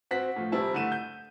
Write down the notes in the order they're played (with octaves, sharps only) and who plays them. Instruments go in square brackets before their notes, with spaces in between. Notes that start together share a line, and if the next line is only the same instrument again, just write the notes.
[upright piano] C4 F#4 F#5 B6
A2 F3
F1 G3 C4 E4 A5
D3 A3 D#7 E7
G6